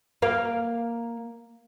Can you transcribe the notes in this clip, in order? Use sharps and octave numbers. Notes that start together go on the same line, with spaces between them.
A#3 F5